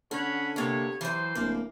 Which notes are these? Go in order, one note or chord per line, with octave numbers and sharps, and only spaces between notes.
D3 C#4 C#5 F#5 B5
C3 A#3 B3 C#5
E3 F#3 C5
D1 A#3